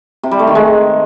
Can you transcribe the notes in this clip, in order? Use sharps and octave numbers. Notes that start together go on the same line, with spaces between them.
C3
G3
A3
D#3
G#3